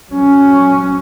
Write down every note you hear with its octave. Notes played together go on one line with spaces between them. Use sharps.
F#3 C#4